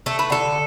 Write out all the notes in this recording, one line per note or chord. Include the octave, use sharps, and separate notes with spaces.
A3 A4
B4
D3 A4